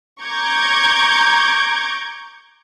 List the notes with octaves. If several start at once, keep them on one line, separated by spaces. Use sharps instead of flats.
A#5 C#6 D6 G6 G#6